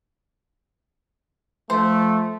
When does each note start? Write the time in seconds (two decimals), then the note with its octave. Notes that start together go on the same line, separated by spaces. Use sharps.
1.70 F3 A3 C5